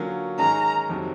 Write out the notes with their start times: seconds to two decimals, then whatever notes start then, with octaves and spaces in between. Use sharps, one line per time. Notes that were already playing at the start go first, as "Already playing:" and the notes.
Already playing: D3 F#3 A#3 C#4 F4
0.38 G#2 D#3 G#3 C#4 A#5
0.89 F2 C3 D#3 F#3